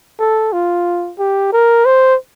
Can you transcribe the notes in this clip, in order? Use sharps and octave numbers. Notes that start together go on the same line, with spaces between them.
A4
F4
G4
A#4
C5